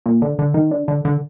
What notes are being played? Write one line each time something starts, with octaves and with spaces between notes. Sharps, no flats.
A#2
D3
D3
D#3
D3
D3
D3